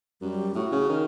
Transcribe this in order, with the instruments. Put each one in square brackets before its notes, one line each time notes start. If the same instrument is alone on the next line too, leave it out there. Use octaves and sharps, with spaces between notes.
[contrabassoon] F#2 [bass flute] G3
[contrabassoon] A2 [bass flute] F#4
[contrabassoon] C#3
D#3